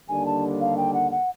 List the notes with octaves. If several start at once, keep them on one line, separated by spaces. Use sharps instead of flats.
D#2 D3 G3 A#3 D4 G#5
A5
F5
G5
F#5
F#5